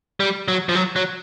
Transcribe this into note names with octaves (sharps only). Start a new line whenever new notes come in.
G3
F#3
F3
F#3
F#3